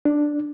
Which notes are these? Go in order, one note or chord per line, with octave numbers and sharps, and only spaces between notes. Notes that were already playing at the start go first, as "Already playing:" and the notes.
D4